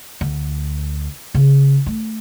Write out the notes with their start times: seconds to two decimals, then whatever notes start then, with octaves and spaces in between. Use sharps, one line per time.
0.21 D2
1.34 C#3
1.86 A3